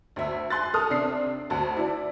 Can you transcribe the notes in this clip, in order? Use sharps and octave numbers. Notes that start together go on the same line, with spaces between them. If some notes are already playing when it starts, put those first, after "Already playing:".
D2 E5
G#5 C6 F#6 A6
A4 A5 D#6 F6
C3 D4 C7
D2 F#4 A5
E4 D5